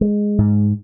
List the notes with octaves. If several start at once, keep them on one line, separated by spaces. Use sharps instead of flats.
G#3
G#2